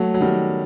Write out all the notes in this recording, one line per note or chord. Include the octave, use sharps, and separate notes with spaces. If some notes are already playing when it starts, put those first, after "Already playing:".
Already playing: F#3 A3
F#3
D#3 G3